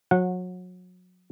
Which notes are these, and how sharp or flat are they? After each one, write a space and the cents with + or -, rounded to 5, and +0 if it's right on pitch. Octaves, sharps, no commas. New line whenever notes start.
F#3 -30 F#5 -20